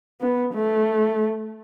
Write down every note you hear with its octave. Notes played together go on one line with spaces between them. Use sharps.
B3
A3